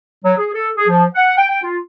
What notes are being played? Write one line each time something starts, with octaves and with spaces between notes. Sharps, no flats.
F#3
G#4
A4
G#4
F3
F#5
G5
G5
F4